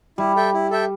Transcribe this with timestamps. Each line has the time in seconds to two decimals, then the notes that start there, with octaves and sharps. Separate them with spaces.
0.18 G3 E4
0.36 A4 E5 G5
0.53 E4
0.71 A4 E5 G5